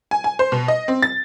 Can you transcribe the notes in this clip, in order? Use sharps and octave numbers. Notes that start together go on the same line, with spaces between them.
G#5
G#5
C5
B2
D#5
C4
A6